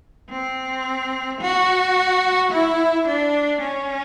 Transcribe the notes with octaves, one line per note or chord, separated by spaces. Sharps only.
C4
F#4
E4
D4
C#4